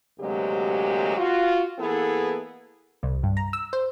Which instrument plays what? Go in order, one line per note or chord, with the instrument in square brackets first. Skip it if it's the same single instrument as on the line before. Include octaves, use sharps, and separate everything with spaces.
[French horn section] D2 C3 F#3 G#3 A#3 G4
F4 F#4
E3 A#3 B3 E4 G#4 A4
[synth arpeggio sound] C2
G2
A#5
E6
C5